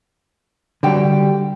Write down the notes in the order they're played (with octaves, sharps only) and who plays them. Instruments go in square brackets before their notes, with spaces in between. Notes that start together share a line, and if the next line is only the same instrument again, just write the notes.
[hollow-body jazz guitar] D3 G3 [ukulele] F#4 G4 G5